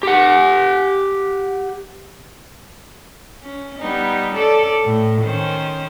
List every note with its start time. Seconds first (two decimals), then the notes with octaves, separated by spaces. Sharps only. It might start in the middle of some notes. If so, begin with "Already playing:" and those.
0.03 G4 F#5
3.43 C#4
3.79 G3 B3 D#4
4.32 C#4 A4 D5
4.85 A2
5.22 D#3 C#4 C5